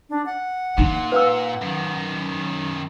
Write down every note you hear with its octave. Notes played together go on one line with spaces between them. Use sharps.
D4
F#5
A#2 D#4
B4 F5 E6
F#2 D#3